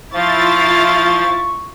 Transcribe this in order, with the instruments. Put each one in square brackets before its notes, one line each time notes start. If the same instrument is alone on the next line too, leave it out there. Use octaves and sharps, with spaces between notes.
[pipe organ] F3 [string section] E4 F4 A6 [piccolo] F5 [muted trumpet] C#6